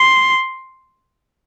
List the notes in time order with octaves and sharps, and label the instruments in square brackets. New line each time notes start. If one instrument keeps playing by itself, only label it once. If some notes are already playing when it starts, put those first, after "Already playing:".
Already playing: [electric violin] C6